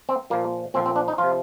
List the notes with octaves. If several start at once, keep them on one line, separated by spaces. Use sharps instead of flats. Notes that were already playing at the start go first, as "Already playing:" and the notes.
C4
A#2 F3 A#3
A#2 F3 C4
C4
D4
D#4
F3 F4
C3